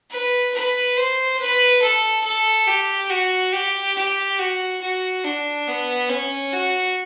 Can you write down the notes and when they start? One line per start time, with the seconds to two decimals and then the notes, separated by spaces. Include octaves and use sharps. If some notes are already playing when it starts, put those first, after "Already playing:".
0.11 B4
0.54 B4
0.97 C5
1.39 B4
1.82 A4
2.24 A4
2.68 G4
3.10 F#4
3.53 G4
3.96 G4
4.39 F#4
4.81 F#4
5.24 D4
5.67 B3
6.09 C#4
6.52 F#4